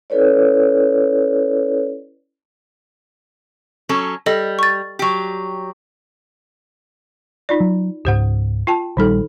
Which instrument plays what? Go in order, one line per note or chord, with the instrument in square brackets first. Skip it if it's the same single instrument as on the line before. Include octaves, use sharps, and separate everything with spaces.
[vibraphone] C#4 E4 A4 B4 C#5 D5
[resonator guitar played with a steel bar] F#3 C#4 A4
[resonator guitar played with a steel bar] G3 [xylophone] A4 D#5
[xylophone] C#6 A6
[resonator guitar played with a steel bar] F#3 G4
[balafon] D#4 F4 D5
[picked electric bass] F#3
[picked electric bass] C#2 G#2 [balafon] G4 C5 F#5
[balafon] F4 G5 A5
[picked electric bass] A#1 G3 [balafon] D#3 D#4 A4